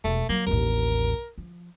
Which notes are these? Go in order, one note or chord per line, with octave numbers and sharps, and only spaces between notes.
E1 A3
F#3 A#3
A1 D#2 A#4
F3